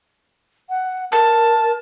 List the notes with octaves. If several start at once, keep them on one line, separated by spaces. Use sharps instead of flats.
F#5
A#4 A5